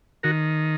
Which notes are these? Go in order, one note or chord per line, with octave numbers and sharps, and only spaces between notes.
D#3 F#4 A#4